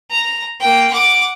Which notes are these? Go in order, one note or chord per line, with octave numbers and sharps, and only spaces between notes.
A#5
A#3 G5
F#5 D6